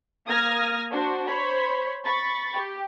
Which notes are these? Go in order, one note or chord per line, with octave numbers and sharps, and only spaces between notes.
A#3 D#6 F6 G#6 A#6
D4 F#4 C5
C5 C#5 B5
B5 C#6 A6
G4